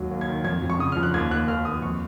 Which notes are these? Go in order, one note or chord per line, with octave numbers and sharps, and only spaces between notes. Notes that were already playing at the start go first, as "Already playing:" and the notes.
Already playing: D#2 F#3
D#2
G#6
D#3
F2 G#6
F2
C#6
C#3 D#6
F3 F6
F#6
D#2 G#6
D#2 F#6
D#2 F6
D#2 D#6
F2 C#6